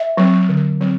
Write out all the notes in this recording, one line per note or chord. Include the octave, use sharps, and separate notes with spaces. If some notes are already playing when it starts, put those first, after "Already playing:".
Already playing: E5
F#3 C4
D3
F#3 C4